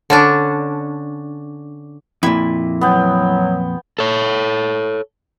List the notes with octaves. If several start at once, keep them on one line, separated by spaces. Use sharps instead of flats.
D3 C#4 D4
F2 A#2 E4
F#3 B3 G5
A4 C#5